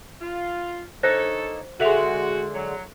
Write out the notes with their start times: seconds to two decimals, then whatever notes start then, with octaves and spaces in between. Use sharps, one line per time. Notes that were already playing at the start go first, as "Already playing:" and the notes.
0.21 F4
1.03 D3 A#3 D#4 A4 C5 C#5 A#6
1.80 D3 G#3 F#4 A4 E5 F7
2.54 F#3